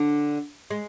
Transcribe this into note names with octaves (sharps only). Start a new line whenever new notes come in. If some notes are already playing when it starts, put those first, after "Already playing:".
Already playing: D3 D4
G#3